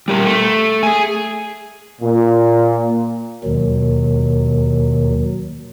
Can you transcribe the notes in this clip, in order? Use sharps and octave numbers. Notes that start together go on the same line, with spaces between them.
G3 G4 A#4
A3
G#4 G#5
A#2
D#2 B2 D#3 F#3